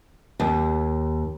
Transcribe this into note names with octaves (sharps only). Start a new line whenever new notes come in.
D#2